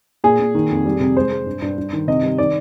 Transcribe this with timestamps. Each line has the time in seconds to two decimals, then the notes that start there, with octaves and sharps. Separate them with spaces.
0.24 A#2 G#4
0.40 A#2
0.55 D#3
0.70 F2
0.85 G3
1.00 C3
1.16 G#3 C5
1.32 G#3
1.46 G2
1.62 G2
1.78 G2
1.93 D#3
2.07 C3 D#5
2.23 G3
2.38 D#3 D5